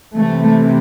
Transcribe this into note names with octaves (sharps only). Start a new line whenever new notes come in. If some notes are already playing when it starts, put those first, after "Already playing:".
C3 E3 A3